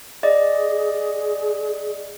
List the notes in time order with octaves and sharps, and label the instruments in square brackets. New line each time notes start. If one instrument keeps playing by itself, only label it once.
[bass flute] G#4 [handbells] D5 D#5